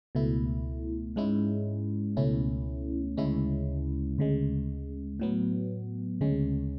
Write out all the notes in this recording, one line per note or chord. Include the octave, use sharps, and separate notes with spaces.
C#2 B2 A3 E4
G#2 G#3 C#4 E4
C#2 B2 A3 C#4 E4
D2 C#3 G#3 C#4 E4
D2 C#3 G#3
A2 F#3 B3
D2 C#3 G#3 C#4